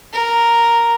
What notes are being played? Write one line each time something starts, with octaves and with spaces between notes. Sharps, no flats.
A#4